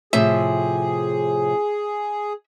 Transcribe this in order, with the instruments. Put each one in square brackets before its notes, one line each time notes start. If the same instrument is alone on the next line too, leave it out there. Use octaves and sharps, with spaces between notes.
[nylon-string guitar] A2 C3 F3 [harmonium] G#4 [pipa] E5